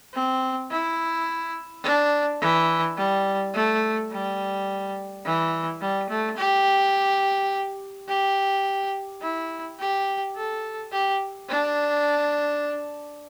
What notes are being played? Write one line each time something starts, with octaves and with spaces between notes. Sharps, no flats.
C4
E4
D4
E3
G3
A3
G3
E3
G3
A3
G4
G4
E4
G4
A4
G4
D4